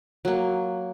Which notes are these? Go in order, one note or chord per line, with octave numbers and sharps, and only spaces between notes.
F#3 A#3